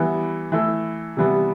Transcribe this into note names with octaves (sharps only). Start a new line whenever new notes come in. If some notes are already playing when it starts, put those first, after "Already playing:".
Already playing: E3 G3 B3 E4
E3 A3 E4 A4
C3 E3 G3 B3 E4